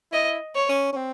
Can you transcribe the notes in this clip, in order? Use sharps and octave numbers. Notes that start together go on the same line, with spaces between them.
E4 D#5
C#5
C#4
C#4
C4